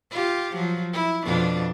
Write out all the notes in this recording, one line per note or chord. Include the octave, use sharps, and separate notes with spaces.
F4 G4
F3 F#3
E4
F2 B2 D4